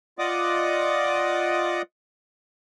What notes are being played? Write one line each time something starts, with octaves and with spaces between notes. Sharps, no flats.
F4 D5 D#5 F#5 D6 D#6